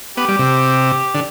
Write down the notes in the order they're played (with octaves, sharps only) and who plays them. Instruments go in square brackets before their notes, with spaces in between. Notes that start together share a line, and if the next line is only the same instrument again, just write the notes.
[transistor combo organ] B3 [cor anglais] G4
[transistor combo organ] G3
C3
D3